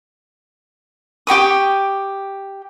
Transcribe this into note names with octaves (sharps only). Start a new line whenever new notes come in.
G4 G5 C#6 D#6